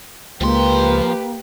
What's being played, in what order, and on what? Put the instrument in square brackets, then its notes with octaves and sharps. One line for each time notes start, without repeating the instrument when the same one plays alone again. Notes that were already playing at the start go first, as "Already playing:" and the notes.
[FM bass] C#2 [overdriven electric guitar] F3 C6 [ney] A#3 [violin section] G4 B4